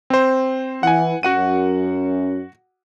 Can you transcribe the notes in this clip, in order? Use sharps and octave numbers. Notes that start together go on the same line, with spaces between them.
C4 C5
E3 F#5 G#5
F#2 F#4 F#5 D#7